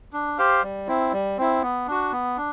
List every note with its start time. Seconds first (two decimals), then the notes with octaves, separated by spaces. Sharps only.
0.13 D4
0.38 G4 C5 F5
0.63 G3
0.87 C4 E4
1.13 G3
1.38 C4 E4
1.62 B3
1.87 D4 F#4
2.12 B3
2.37 D4